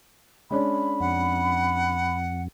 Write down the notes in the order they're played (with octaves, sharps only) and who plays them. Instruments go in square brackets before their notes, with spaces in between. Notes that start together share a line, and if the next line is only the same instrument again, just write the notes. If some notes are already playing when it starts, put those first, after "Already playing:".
[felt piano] G#3 C#4 D4 [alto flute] B5
[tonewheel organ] F2 [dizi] F#5